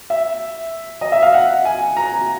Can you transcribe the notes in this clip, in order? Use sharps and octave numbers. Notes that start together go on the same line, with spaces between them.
E5
D#5
E5
F5
F#5
G#5
A#5